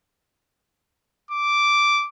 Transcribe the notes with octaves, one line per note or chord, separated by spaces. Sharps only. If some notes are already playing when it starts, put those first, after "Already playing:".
D6